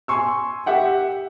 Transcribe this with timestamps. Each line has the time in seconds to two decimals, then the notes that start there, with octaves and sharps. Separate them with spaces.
0.08 G#5 C6 C#6 E6
0.66 G4 E5 F#5 G5